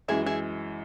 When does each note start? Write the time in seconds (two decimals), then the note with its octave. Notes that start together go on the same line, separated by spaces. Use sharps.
0.08 F#2 E3 G#3 E4 G#4
0.26 E4 G#4